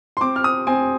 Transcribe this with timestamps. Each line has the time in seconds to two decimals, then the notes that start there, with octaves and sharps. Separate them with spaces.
0.17 C6
0.21 C4 D6
0.36 F6
0.44 D#6
0.67 C4 G#5